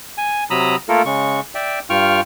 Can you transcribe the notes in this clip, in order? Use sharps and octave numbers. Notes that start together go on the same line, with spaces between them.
G#5
C3 F#3 A#5 B5 D#6 E6
A3 A#3 F4 A4 A#4
C#3 G#3 C#6
D5 E5 G5
G2 F4 G5 C#6 F6